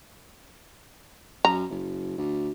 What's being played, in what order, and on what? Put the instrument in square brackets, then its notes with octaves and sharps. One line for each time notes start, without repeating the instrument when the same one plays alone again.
[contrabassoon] F#2 [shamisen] A#5
[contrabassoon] F#1
D2